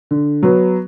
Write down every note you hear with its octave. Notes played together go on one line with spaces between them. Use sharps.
D3
F#3 B3